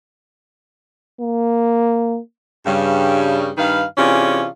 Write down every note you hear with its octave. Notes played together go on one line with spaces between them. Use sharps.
A#3
G2 C#3 G3
G2 D#3 B4 F5
C3 E3 C#4 D4 F4 G#4